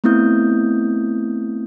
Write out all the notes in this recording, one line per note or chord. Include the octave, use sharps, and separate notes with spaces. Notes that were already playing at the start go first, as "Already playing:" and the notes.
A3 B3 C4 E4 D#6 G6